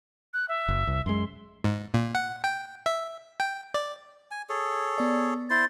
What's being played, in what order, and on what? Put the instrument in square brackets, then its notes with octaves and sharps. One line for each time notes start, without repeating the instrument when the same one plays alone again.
[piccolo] F#6
E5
[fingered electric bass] F#1
C2
[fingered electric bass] F#2 G#3 [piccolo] C6
[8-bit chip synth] G#2
A#2
F#5
G5
E5
G5
D5
[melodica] G#5
G#4 A4 C#5
[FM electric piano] B3 D5
[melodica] E4 C5 C6 [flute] A6